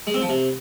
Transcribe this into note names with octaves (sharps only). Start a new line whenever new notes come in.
G#3
C4
F3
C3